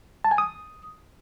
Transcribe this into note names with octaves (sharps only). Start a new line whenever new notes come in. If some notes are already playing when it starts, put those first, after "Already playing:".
A5
G#5
D#6